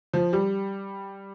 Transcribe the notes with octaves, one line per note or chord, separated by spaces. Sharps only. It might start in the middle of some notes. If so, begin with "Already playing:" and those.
F3
G3